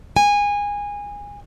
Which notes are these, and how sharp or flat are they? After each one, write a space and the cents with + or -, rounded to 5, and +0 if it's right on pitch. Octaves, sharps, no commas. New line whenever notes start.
G#5 -20